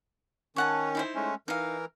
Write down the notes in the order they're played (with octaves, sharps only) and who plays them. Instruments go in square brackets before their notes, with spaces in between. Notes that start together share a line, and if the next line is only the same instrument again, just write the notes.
[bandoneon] D#3 C#4 [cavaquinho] C#5 F#5 A5
[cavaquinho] D#4 E4 C5
[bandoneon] G#3 A3 C#4
[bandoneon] E3 A#4 [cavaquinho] D#4 F5